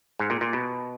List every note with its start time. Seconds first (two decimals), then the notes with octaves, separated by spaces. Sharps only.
0.19 G#2
0.30 A#2
0.41 A#2
0.53 B2